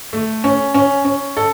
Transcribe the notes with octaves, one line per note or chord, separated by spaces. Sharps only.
A3
C#4
C#4
C#4
A4